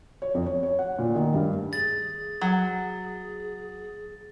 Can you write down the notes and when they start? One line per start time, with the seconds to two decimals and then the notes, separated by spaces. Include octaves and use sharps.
0.22 C#5
0.35 F2
0.46 C#5
0.63 C#5
0.79 F#5
0.99 A#2
1.15 D#3
1.34 G2
1.73 G#4 A6
2.41 F#3